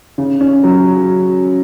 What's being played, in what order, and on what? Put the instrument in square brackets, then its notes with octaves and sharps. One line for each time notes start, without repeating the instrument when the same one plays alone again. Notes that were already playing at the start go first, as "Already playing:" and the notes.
[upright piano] C#3
C#4
F#3